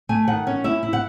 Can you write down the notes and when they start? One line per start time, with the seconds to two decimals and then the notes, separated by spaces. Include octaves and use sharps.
0.09 A3 G#5
0.27 D#3 F#5
0.47 C#4
0.64 E4 E5
0.83 E4
0.93 F#5